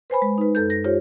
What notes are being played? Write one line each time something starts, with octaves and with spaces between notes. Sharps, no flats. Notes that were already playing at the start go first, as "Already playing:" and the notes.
B4 C5 G#5 B5
G#3
D#4 B4
F#2 A4 G6
A#6
F4 G4 C5 C#5